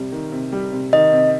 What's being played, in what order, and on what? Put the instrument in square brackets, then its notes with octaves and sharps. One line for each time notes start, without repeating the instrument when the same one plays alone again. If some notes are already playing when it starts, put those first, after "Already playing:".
Already playing: [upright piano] C3 G3
D#3
C3
G3
C3
[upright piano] D#3 [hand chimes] D#5
[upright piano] C3